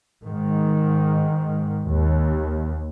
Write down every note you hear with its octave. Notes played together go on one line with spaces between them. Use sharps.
G#2 D#3
D#2